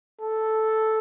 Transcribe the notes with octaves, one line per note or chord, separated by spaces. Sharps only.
A4